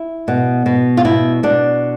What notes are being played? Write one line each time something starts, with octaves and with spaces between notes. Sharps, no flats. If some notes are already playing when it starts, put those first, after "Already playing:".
Already playing: E4
B2
B2
F4
B2 E4
B2 D4